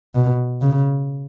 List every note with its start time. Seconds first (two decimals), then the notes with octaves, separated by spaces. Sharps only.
0.15 B2
0.62 C#3